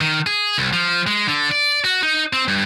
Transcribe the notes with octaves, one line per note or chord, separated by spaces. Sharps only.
D#3
G#4
C2
F3
G#3
D3
D5
F#4
D#4
C4
G2